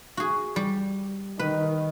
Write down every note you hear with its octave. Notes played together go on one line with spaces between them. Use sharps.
F#4 G#4
G3
D#3 B4